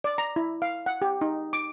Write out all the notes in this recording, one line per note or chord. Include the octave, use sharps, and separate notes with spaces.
D5
A#5
E4
F5
F#5
G4
D#4
D6